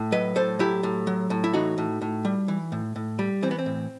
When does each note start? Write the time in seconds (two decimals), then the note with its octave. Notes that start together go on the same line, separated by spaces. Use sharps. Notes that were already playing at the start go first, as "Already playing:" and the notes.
Already playing: A2
0.12 F#3 B4 D#5
0.36 A2 A4 C5
0.59 F#3 E4 G4
0.83 A2
1.07 F#3
1.30 A2
1.44 E4
1.54 E3 D#4 F#4
1.78 A2
2.02 A2
2.25 G3
2.48 E3
2.72 A2
2.96 A2
3.19 G3
3.43 E3 C4
3.51 B3
3.59 C4
3.66 A2